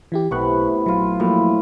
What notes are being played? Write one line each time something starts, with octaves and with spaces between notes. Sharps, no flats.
E3 E4 G4
B1 A2 C3 B3 C#6 F#6
A#1 F#3 E4 F4
A2 F3 F#3 A#3